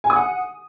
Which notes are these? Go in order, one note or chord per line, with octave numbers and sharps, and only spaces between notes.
G#5
D#6
F#5